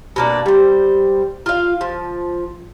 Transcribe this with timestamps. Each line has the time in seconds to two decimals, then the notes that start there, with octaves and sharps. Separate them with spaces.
0.16 B2 A#3 D4
0.46 G3 C5
1.46 F4 F5
1.81 F3